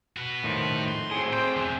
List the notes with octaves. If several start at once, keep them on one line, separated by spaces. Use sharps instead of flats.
F#4 B4
A2 D#3 F3
C6
A2 C4 G#4
C5 G5
E3 G#3